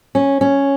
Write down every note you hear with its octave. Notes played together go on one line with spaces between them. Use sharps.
C#4
C#4